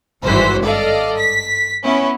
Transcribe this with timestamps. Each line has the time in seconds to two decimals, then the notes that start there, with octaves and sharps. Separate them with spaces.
0.23 G#1 G2 E3 F#4 C5 B6
0.64 A4 D5 D#5 F5
1.19 B6
1.83 B3 C#4 E4